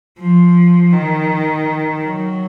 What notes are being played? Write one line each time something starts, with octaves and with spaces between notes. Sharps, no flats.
F3
D#3
F#3